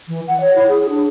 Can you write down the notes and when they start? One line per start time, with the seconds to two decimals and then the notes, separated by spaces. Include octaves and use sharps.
0.08 E3
0.27 F#5
0.40 C#5
0.55 E4
0.68 G#4
0.89 D4